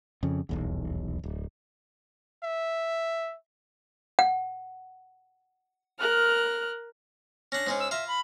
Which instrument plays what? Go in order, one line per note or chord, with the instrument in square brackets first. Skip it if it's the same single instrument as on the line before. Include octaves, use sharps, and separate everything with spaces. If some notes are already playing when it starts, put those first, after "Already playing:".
[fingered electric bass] F2 C#3
D#1 B1 E2
D1
[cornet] E5
[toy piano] F#5
[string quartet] A#4 F6 F#6
[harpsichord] C#4 D4 [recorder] A#6
[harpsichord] G#2 G#3 C#4
[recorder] E6
[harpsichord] F4 A#5 [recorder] E5
[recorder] B5